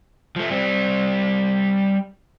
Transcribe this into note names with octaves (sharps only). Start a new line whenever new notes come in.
F3 A3
G3 C4